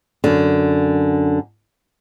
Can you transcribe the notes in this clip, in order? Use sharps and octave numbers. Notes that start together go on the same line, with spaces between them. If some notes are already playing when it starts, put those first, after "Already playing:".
F#2 D3